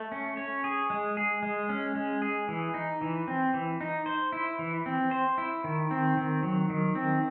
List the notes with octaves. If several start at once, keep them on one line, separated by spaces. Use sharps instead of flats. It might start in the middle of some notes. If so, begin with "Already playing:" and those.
Already playing: A3
C#4
C#5
G#4
G#3
G#4
G#3
C#4
G#3
G#4
E3
D#4
E3
C4
E3
D#4
C5
E4
E3
C4
C5
E4
D#3
C4
D#3
F#3
D#3
C4